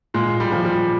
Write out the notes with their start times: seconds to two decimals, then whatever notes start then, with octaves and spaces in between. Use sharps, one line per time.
0.14 A#2 G#3
0.40 G3
0.52 F3
0.65 G3